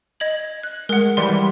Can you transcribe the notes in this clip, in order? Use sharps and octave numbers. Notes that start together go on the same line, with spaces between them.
D#5 G#6 F#7
F#6
G#3 A#4 F#5
E3 G3 B5 C6